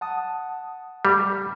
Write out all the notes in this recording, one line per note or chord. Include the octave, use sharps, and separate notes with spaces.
F#5 A5 D#6
G3